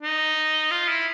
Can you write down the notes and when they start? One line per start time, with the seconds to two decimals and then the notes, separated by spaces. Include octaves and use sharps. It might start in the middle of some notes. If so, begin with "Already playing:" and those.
0.03 D#4
0.71 F4
0.88 E4